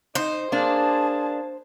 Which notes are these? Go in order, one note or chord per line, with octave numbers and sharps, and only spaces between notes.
D#4 C5
A#3 D4 G#4 A5